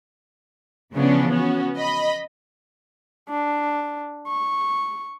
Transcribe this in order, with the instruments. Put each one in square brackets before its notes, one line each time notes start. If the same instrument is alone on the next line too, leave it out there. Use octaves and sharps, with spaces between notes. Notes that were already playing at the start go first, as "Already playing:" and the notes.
[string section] C#3 E3 F3 B3 C#4 D4
B3 C#4 F#4
D#5 B5
[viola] D4
C#6